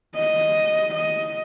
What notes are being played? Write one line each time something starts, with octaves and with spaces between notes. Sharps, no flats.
D#5
D#5